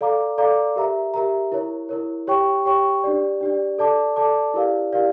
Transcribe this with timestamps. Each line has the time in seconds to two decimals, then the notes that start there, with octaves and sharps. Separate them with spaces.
0.01 A4 D5 F5 A#5 D6
0.38 A4 D5 F5 A#5 D6
0.76 G4 A#4 E5 A#5
1.14 G4 A#4 E5 A#5
1.52 E4 A#4 C#5
1.89 E4 A#4 C#5
2.27 G4 C#5 G5 C#6
2.65 G4 C#5 G5 C#6
3.04 D4 G4 D5
3.41 D4 G4 D5
3.79 A4 D5 A5 D6
4.16 A4 D5 A5 D6
4.54 E4 G4 A#4 D5 F5
4.92 E4 G4 A#4 D5 F5